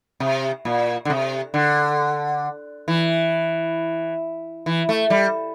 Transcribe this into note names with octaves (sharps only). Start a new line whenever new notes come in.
C3
A#2
D3
C3
D3
E3
E3
A3
G3